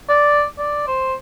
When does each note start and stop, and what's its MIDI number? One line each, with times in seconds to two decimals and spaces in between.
0.08 0.45 74
0.58 0.85 74
0.88 1.14 72